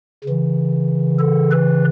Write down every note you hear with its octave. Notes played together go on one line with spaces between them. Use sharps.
C#3 E3
A4
B4